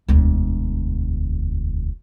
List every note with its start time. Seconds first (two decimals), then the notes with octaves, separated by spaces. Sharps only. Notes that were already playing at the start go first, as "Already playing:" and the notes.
0.08 E1 D2